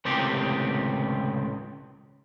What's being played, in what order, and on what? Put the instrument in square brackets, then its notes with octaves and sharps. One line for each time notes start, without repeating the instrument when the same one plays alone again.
[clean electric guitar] C#2 A2 C3 D#3 C4 G4